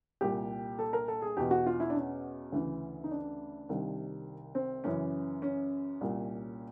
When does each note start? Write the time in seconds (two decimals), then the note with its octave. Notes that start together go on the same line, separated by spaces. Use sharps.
0.21 C2 A#2 G4
0.79 A4
0.93 A#4
1.08 A4
1.22 G#4
1.37 E2 B2 G4
1.51 F#4
1.66 F4
1.80 E4
1.90 D4
1.95 C#4
2.52 D2 C#3 E3
3.04 D#4
3.11 D4
3.69 C2 C3 D#3
4.55 C4
4.84 F#2 C#3 E3 C#4
5.42 C#4
6.01 C2 A#2